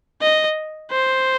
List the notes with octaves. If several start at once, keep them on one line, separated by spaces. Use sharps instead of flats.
D#5
C5